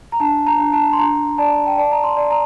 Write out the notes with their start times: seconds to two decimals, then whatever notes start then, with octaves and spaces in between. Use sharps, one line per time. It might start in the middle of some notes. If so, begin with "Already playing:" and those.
0.12 A#5
0.20 D4 A5
0.46 A#5
0.59 D4
0.73 A5
0.93 C6
0.99 D4 A#5
1.38 D5 A5
1.67 G5
1.78 D5 A5
1.91 A#5
2.04 C6
2.17 D5
2.31 A#5